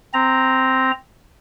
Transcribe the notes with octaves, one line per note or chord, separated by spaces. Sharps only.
C4 A#5